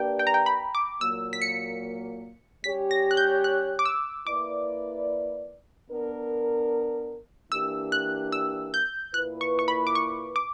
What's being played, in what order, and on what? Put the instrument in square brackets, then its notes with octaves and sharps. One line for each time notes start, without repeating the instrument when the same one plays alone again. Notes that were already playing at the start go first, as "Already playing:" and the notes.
Already playing: [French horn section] A#3 D4 G4 B4 D5 [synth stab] G5
[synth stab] G5
A#5
G5
B5
D6
[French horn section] A#2 F#3 A#3 [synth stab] E6
[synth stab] B6
C#7
[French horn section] G3 C#4 G4 C#5 [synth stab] B6
[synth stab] A#6
F#6
G6
F#6
D6
E6
[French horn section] A#3 E4 B4 D5 [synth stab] D6
[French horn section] B3 D4 A#4
[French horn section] E3 A#3 D4 G4 [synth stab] E6
[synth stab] F#6
E6
G6
[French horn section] A#2 A#3 E4 B4 [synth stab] F#6
[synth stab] C#6
C#6
B5
D6
C#6
D6